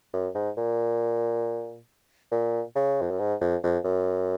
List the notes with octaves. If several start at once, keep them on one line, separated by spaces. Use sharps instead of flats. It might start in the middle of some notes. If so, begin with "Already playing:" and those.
F#2
G#2
A#2
A#2
C#3
F2
F#2
G#2
F2
F2
F#2